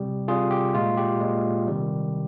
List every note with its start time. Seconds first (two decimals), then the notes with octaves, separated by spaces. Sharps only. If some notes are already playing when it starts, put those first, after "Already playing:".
Already playing: C3 G3 G4
0.28 C3 G3 F4 G#4
0.51 G4
0.74 A#2 G#3 F4
0.97 G4
1.21 A#2 G#3
1.67 C3 D#3 G3